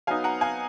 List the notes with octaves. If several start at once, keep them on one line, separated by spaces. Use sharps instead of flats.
F#3 B3 D#4 F5 G#5
F#5 A#5
F5 G#5